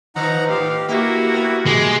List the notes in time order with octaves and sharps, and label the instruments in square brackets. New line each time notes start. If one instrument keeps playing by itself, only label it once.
[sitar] D#3 F3 [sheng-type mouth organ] D#4 F#5 A#5
[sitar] A2 [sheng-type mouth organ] G4 [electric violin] F5
[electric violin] A#3 F#4 [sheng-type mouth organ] E4 [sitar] G4
[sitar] B3
[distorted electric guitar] G#3 [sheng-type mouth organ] D6